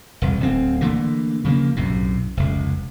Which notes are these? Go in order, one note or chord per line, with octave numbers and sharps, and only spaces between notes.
E1 C2
D1 C4
D3 E3 A3 A#3
C#3 F3 G#3 A#3
B1 F#2 A2 C3
F1 C#2